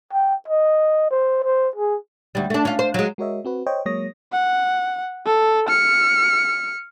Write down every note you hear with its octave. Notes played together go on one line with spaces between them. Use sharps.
G5
D#5
C5
C5
G#4
D2 G3
A3 D4
C#4 F4
C5
F#3 G#3
G#3 F#4 A#4 C#5 D#5 E5
C4 F#4 B4
C5 C#5 D#5 G5
F#3 G#3 A#3 C#5 D#6 A#6
F#5
A4
F6 C#7